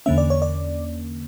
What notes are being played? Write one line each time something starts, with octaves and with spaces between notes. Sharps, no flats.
E2 D3 A#3 C#4 E5
D5
C#5
D5